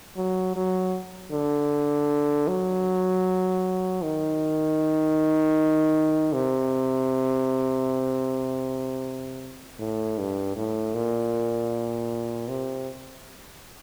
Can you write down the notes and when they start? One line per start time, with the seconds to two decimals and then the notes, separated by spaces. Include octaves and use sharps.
0.17 F#3
0.56 F#3
1.32 D3
2.48 F#3
4.03 D#3
6.33 C3
9.79 A2
10.18 G2
10.56 A2
10.94 A#2
12.48 C3